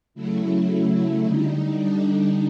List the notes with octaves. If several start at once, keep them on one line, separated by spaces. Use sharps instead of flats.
C#3 F#3 A3 E4
D3 G3 D#4
D4